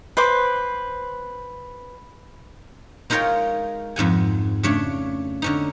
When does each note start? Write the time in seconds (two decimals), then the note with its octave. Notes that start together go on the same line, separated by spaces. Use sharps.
0.17 B4 C5 D6
3.10 G#3 D#4 F4 A#4 C#5 G5
3.96 F2 G#2 F#5 G#5
4.63 C#3 A3 D4 C#5
5.42 D3 C#4 D#4